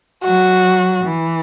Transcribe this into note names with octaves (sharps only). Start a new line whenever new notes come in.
F#3 F#4
E3